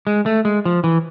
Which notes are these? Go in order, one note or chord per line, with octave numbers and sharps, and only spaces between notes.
G#3
A3
G#3
F3
E3